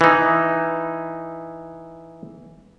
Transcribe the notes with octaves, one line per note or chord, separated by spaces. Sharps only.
E3 D#4